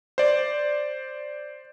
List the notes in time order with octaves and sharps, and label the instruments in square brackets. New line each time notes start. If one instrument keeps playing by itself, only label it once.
[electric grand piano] C5 D5